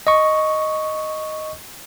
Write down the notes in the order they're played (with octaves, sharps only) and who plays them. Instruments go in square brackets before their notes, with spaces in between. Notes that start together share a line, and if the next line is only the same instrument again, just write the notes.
[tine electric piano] D#5 C#6